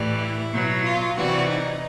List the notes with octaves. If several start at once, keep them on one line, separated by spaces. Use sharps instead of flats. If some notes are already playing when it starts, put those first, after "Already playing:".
Already playing: A2 E3 G3
E4
B2 F#3
F4
C3 E3 G3 F#4
D#4